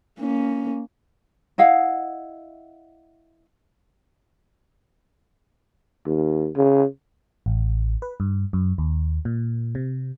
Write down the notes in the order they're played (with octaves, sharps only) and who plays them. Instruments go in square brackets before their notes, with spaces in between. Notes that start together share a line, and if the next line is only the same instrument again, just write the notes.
[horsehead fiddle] A#3 C#4
[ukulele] E4 D#5 F5 F#5
[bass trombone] D#2
C#3
[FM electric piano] A1
B4
G2
F#2
D#2
A#2
C3